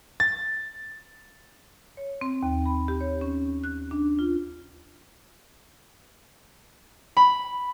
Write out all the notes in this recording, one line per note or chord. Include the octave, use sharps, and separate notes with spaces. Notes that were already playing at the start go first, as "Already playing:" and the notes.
A6
C#5
C4
D#2
B5
G4
C#5
C#4
F#6
D4
F4
B5